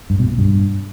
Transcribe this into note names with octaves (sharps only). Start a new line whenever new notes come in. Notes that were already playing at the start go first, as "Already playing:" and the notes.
G2
B2
A#2
G2